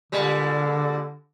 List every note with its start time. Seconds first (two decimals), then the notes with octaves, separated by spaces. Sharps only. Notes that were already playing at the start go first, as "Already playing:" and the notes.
0.12 A#2 D3 G3 G#3